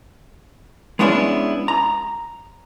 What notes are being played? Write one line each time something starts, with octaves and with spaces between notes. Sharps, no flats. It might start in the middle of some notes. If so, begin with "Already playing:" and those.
G#3 B3 C#4 D4 E4
A#5